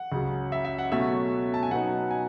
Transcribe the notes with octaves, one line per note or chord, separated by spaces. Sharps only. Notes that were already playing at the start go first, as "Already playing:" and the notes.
Already playing: F#5
C#2 C#3 F#3
E5
E5
F#5
B2 F#3 A3 C#4 E5
A5
G#5
B2 F#3 B3 D#4 F#5
G#5